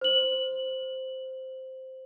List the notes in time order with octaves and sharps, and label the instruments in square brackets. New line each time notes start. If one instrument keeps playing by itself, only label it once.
[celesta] C5 F#7